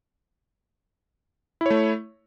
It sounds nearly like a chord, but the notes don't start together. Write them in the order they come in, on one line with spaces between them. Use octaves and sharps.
E4 C#5 A3